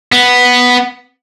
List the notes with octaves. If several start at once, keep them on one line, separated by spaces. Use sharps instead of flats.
B3